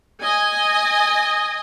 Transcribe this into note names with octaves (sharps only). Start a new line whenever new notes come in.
D#5 G#5